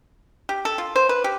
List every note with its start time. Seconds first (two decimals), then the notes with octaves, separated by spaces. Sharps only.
0.49 G4
0.65 A4
0.78 F4
0.96 C5
1.09 B4
1.24 G4